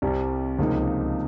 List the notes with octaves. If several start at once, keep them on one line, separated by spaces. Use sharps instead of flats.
C2 C3 G3
C#2 C3 F3 A#3 D#4